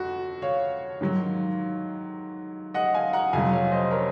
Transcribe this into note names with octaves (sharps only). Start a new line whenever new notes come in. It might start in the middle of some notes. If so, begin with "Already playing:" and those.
Already playing: F2 F#4
C#5 F5
G#2 D#3 F#3
D#5 F#5
F5 G#5
F#5 A#5
F2 C3 F#3 F5 G#5
C#5 F5
C5 D#5
A#4 C#5